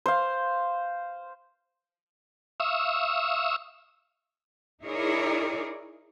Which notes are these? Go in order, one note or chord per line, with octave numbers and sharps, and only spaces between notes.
C5 F5
E5 F5 C#6 D#6 E6
D#4 E4 G#4 A#4 C#5 D5